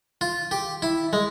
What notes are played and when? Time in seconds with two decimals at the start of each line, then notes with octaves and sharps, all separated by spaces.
0.21 F4
0.51 G4
0.82 E4
1.13 G#3